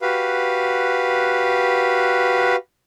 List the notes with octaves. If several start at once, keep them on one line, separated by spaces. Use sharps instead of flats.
F#4 G4 B4 F5